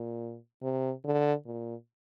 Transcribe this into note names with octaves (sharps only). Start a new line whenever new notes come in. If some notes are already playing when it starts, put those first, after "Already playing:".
Already playing: A#2
C3
D3
A#2